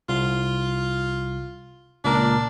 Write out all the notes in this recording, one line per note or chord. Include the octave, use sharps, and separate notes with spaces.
C2 F4
C#2 A#2 D4 A#4